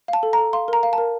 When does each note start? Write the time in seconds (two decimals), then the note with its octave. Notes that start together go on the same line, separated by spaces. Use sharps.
0.08 F5
0.13 A5
0.23 A4
0.33 A#5
0.38 A4
0.53 F5 C6
0.68 A#4 A#5
0.83 F5
0.93 A5
0.98 A#4